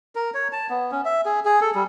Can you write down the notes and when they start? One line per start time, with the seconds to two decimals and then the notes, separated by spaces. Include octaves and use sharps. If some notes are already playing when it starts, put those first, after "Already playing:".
0.15 A#4
0.34 C#5
0.53 A5
0.70 B3
0.91 C#4
1.05 E5
1.26 G#4
1.45 G#4
1.61 A4
1.75 G3